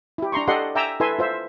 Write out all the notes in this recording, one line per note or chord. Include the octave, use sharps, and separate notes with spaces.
E4 G4
D4 A#5 C6 C#6
G4 A4 D5 D#5 F#5 C6
E5 G5 G#5 A#5 D6 E6
E4 A4 B4 E5 G#5 C6
F4 C5 E5